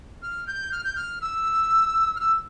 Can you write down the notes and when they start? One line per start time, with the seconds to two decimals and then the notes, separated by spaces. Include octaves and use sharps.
0.22 F6
0.47 G6
0.72 F6
0.84 G6
0.96 F6
1.21 E6
2.16 F6
2.20 E6